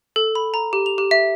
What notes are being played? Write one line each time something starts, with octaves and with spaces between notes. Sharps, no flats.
A4
B5
A#5
G4
F7
G4
E5